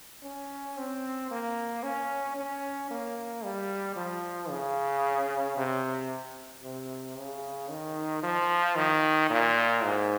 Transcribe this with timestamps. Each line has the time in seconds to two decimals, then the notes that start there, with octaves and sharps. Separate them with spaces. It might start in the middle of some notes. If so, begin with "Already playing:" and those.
0.23 C#4
0.77 C4
1.31 A#3
1.83 C#4
2.36 C#4
2.91 A#3
3.44 G3
3.96 F3
4.50 C#3
5.57 C3
6.63 C3
7.16 C#3
7.70 D#3
8.23 F3
8.75 D#3
9.30 A#2
9.83 G#2